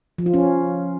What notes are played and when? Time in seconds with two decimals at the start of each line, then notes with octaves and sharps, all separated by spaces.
0.18 F3
0.26 F4
0.34 C#4